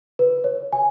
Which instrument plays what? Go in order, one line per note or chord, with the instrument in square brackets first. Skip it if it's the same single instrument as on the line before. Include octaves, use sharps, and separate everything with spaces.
[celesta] B4
C#5
G#5